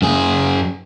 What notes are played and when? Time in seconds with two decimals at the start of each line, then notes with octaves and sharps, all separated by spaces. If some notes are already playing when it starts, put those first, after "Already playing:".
0.02 F#2 G#4